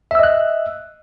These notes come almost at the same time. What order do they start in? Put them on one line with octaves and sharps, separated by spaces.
E5 E6 D#5 F#6